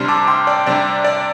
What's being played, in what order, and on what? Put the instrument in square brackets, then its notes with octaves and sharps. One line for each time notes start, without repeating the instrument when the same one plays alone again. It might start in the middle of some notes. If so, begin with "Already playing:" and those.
Already playing: [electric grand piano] C3 G3 D4 C6 F6
A5 D6
G5 C6
D5 G5
C3 G3 D4 D5
D5